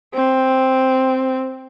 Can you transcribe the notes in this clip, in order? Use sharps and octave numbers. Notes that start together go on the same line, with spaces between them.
C4